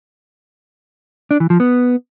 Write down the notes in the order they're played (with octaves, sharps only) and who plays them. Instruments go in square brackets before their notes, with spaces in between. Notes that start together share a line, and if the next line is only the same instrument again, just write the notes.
[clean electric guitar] D4
E3
F3
B3